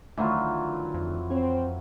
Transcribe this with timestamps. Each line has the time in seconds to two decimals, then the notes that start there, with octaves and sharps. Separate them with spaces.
0.17 D2 D#3 E3 F#3 F4
0.94 F2
1.30 C4 C#5